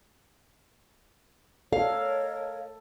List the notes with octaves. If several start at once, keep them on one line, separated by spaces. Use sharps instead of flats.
A4 A#4 C#5 D#5 F5